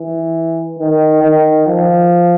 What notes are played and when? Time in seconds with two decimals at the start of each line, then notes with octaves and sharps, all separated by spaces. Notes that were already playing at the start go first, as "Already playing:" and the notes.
Already playing: E3
0.79 D#3
1.23 D#3
1.67 F3